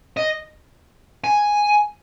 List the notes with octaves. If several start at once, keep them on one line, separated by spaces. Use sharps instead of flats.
D#5
G#5